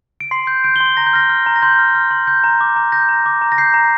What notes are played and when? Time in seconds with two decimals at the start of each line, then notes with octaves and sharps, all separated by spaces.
0.20 D7
0.31 C6 C7
0.47 G6
0.64 G6 D7
0.76 G7
0.80 C6
0.86 G7
0.97 A#5 A#6
1.07 G6
1.13 F6 A#6
1.29 F6
1.46 A#5
1.56 A#6
1.62 C6 G6
1.79 F6
1.95 F6
2.11 C6
2.27 G6
2.44 A#5
2.61 D6
2.76 A#5
2.92 G6 A#6
3.09 A#5
3.26 D6
3.41 A#5
3.52 A#6
3.58 G6 C7
3.74 A#5